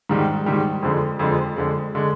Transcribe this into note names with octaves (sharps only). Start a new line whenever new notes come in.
G#2 D#3 G3
G#2 D#3 G3
F2 D3 F3 G#3
F2 D3 F3 G#3
F2 D3 G#3
D3 G#3